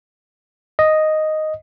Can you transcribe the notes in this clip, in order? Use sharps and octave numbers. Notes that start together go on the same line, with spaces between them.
D#5